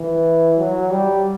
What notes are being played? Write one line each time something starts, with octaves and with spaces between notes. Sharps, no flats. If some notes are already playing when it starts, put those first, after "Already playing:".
Already playing: E3
F#3
G3